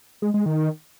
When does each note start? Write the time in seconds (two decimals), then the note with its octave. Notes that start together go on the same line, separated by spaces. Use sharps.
0.22 G#3
0.34 G#3
0.46 D#3